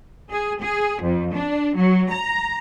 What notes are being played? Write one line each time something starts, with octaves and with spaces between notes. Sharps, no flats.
G#4
G#4
F2
D4
F#3
A#5